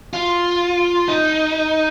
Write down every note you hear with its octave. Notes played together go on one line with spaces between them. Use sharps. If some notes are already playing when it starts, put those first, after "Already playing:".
F4
D#4